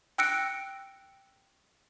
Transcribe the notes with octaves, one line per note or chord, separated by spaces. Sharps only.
G5 E6 F#6 A#6 C#7 D7